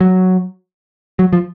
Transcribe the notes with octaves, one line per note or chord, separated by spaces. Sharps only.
F#3
F#3
F3